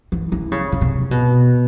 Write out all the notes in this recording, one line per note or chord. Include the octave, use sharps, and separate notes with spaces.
E3
E3
C#3
C#3
C3
B2